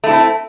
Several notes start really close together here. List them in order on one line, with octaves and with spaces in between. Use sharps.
A3 E4 C4